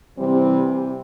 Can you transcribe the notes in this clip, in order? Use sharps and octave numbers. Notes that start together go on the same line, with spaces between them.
C3 E3 G3 C4